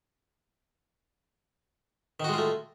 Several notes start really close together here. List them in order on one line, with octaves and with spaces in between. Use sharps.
D#3 F#4 G#3 F4 A3